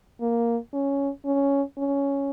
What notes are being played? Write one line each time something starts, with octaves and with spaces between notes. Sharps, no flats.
A#3
C#4
C#4
C#4